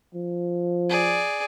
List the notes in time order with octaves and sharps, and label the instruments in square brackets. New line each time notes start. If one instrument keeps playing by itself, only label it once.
[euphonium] F3
[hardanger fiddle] G#4 D5